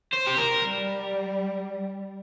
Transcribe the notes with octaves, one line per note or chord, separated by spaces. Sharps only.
C5
G4
A#4
G3